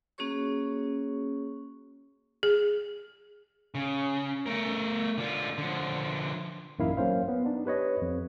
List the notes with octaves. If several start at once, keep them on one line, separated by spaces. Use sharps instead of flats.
A#3 C#4 F#4 G#4 C#5 C#6
G#4
C#3
A3 A#4
D3 F4
D3 F3
A1 F#2 A#3 D#4 E4 F5
F#3 A#3 C#4 C5 F5
B3
D4 D#4
G4 B4 C#5 D#5
F2